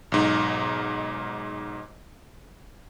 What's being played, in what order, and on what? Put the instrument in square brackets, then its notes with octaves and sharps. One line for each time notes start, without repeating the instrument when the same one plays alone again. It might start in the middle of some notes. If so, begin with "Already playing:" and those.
[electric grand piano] B1 G#2 D#4